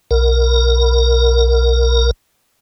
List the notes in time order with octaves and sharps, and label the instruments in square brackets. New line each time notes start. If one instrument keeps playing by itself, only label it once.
[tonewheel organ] B1 A#4